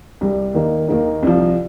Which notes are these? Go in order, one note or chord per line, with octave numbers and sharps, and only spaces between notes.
C2 C3 G3
D#2 D#3 A#3 D#4
D#2 D#3 A#3 D#4
C2 C3 F3